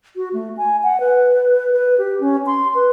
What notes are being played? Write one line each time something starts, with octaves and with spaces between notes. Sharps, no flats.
F#4
A3
G#5
F#5
B4
B4
G4
C#4
C6
B4